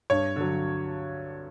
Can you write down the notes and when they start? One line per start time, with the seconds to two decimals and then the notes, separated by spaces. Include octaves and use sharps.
0.10 G2 C#5
0.36 D3 F#3